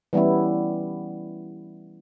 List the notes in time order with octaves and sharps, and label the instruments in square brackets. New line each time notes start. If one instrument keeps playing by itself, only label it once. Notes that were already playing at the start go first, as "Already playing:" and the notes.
[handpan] E3 G3 B3 C#4 E4